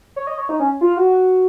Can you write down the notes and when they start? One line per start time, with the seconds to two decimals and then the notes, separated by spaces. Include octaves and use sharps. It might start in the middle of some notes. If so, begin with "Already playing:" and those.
0.16 C#5
0.27 D#5
0.38 C#5
0.49 D#4
0.60 C#4
0.81 F4
0.97 F#4